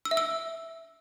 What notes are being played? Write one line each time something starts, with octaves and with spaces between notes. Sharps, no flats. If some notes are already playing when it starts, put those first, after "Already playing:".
E6
E5
E6